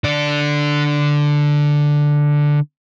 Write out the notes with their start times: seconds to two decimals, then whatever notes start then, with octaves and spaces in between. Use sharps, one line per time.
0.04 D3 D5